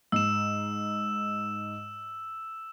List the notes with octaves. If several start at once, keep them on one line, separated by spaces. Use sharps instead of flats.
G#2 E6 E7